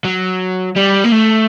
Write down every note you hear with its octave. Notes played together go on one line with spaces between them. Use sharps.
F#3
G3
A#3
A3